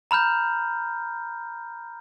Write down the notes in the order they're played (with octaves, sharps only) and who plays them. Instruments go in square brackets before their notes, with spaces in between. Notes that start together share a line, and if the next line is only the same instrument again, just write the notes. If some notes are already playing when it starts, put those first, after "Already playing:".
[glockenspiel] A#5 B5 F6 G6